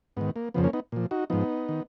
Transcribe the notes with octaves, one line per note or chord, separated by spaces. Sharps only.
G#2 D#3 B3
A#3
F2 C#3 F3 B3
A#3 C#4
B3 D#4
A#2 F3
D#4 F#4
G#2 F3 B3 D#4
D#3